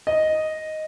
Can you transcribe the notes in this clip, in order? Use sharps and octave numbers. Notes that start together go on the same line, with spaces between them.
D#5